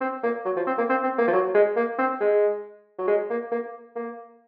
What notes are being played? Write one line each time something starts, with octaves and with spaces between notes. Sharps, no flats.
C4
A#3
F#3
F3
C4
A#3
C4
C4
A#3
F3
F#3
G#3
A#3
C4
G#3
F#3
G#3
A#3
A#3
A#3